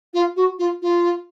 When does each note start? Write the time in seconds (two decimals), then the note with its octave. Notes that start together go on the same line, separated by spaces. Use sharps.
0.14 F4
0.36 F#4
0.59 F4
0.82 F4